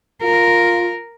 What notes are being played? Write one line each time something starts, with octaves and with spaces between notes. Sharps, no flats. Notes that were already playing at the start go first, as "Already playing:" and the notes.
F4 A#4